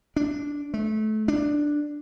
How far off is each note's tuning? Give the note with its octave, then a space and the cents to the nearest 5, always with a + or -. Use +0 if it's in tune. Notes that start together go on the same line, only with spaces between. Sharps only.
D4 -10
A3 -25
D4 +5